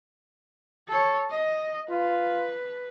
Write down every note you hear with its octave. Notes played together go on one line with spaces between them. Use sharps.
A4 C#5
D#5
F4 B4